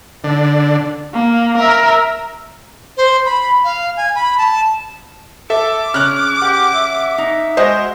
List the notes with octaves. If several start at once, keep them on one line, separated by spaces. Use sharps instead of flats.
D3
A#3
A#4 E5
C5
B5
F5
G#5
B5
A5
A4 E5 D6
C#3 F6 F#6
G4 F#5
E5
D#4
G#3 F#4 C5 D#5